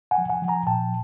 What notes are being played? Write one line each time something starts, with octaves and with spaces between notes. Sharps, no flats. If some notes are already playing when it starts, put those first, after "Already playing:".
F#5 G#5
F3
F#5 G#5
F3
G#5 A#5
A#2 G5 A5